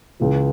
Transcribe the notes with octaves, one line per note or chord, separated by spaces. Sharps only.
C#2 C#3 E3